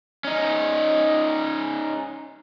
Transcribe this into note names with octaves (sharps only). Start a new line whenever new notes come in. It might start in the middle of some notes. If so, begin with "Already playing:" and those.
C#4 D#4